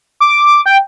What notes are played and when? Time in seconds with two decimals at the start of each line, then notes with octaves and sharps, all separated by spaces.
0.20 D6
0.66 G5